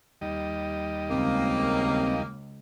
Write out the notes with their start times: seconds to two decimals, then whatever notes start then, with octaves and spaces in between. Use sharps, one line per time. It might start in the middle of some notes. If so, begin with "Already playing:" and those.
0.21 D#2 G3 D#5
1.10 C#2 A#3 C4